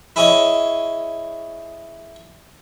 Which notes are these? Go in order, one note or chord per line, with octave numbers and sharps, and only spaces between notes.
E4 G#4 C#5 D#5